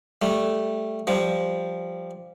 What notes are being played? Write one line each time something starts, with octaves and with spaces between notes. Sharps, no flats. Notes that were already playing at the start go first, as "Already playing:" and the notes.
G3 A3
F3 G3